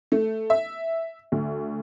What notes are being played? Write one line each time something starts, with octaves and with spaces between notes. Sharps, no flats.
A3
E5
D2